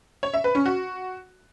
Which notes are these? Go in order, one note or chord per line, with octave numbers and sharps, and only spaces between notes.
C#5
E5
B4
C#4
F#4